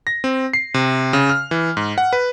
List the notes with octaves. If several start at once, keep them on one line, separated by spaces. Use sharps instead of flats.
A#6
C4
C7
C3
C#3
F6
E3
G#2
F#5
B4